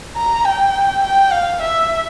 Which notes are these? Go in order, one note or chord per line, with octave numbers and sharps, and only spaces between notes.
A#5
G5
G5
F5
E5